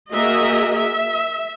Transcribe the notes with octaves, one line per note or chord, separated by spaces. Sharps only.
A#3 F#4 G#4 A#4 D#5 E5
E5